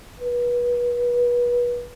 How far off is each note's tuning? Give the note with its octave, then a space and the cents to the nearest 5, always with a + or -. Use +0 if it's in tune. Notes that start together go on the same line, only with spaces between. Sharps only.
B4 -30